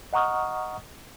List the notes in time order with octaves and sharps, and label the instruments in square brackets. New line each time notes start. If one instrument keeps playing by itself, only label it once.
[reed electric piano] D#5 F#5 A#5 C#6 D#6 F6